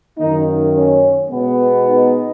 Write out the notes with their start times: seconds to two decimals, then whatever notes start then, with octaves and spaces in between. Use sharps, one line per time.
0.18 F#2 D#3 A#3 D#4
0.75 C#4
1.29 B2 G#3 B3
1.86 D#4